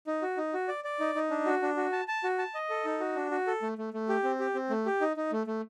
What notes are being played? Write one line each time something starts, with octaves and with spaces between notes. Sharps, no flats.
D#4
F#4
D#4
F#4
D5
D5
D#4
D#4
D4
F#4
D4
F#4
A5
A5
F#4
A5
D#5
A4
D#4
F#4
D4
F#4
A4
A3
A3
A3
G4
C4
G4
C4
A3
G4
D#4
D#4
A3
A3